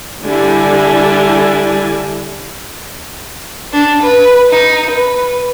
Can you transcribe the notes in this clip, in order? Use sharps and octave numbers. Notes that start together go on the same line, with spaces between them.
D3 G3 D4 E4 G#5
D4
B4
D#4
B4